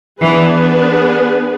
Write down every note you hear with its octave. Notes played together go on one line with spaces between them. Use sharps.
E3 B3 D4 G#4 B4